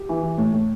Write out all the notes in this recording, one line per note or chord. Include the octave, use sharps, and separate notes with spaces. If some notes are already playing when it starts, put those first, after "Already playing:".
Already playing: G4
E3
E3
A2
A2